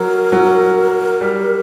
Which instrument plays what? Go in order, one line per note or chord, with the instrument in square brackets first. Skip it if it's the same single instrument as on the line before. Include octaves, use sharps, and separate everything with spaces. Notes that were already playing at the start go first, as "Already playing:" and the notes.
Already playing: [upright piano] F#3 [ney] A#4
[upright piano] F#3
G3